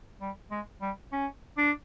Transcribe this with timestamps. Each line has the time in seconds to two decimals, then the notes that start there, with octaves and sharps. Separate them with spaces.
0.21 G3
0.51 G#3
0.82 G3
1.12 C#4
1.58 D4